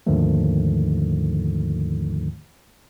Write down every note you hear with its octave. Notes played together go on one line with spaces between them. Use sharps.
D#2 G#2 D3 D#3 F3 A3